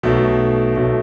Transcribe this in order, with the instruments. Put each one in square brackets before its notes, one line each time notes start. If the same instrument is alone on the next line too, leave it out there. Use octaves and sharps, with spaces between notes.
[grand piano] B1 B2 A3
B1 B2 A3